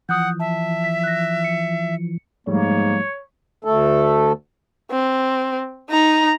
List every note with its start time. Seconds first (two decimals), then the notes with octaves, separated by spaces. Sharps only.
0.09 E3 F3 F#5 D#6 F#6 G6
0.40 E5 A5
0.84 B6
1.03 F#6 A#6
1.44 C#7
2.47 G#2 F3 G3 A3 A#3 C#5
3.64 D2 A3 A4
4.91 C4
5.89 D#4 A#5